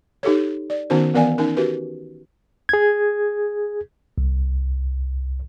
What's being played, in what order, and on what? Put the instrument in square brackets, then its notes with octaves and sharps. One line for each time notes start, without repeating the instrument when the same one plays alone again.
[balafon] D#4 G4 A4 C#5
D5
D#3 B3 C#4 D#4 F#4 C5
E3 B3 A#4 D5 F5 G#5
C#4 D#4 A#4
F#4 G4 A#4 B4
[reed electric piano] G#4 G#6
[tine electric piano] C2